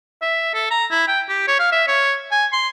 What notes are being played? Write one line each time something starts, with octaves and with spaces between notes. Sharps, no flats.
E5
A4
A#5
E4
G5
G4
C#5
F5
E5
C#5
G#5
C6